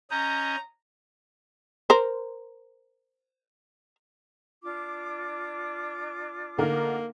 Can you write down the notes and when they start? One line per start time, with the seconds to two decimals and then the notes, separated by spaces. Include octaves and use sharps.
0.11 C#4 D#5 A#5 G6
1.90 A#4 C5
4.63 D4 F4 D6
6.58 D3 A#3 D#4 A#4